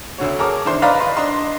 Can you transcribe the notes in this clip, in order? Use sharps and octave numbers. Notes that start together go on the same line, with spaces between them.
D2 D3 F#4 C#5
G#4 A#4 C#5 A5 D6
D#3 E3 D4 C5 C6
B4 D5 D#5 F5 A#5 B5
B4 C6
D4 D#5 A#5 C6